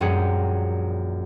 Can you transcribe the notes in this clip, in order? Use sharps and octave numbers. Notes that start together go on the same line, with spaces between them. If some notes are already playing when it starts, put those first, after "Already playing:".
A#1 F#2 G3 G#4 F#5